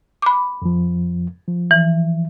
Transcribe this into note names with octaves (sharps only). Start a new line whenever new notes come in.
B5 D6
F2 F3
F3
E3